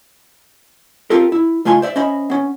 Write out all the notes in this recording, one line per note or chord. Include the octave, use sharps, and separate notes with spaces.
C4 F4 G4 A4 A#4
E4
C#2 A3 F4 G#5 C6
C5 D5 E5
C#4 C5 D#5 E5 B5
B3 C#4